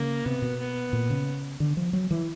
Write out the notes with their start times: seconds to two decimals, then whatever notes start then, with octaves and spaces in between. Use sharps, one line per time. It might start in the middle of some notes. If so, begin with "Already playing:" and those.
Already playing: C#3 A#3
0.25 C3 B3
0.42 B2
0.59 B3
0.93 A#2
1.10 C#3
1.60 D3
1.77 F3
1.93 F#3
2.11 E3